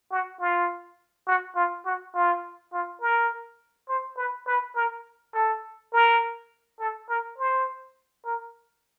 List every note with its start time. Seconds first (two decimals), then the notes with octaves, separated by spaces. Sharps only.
0.12 F#4
0.40 F4
1.27 F#4
1.56 F4
1.86 F#4
2.15 F4
2.73 F4
3.01 A#4
3.89 C5
4.17 B4
4.48 B4
4.76 A#4
5.34 A4
5.93 A#4
6.79 A4
7.09 A#4
7.38 C5
8.25 A#4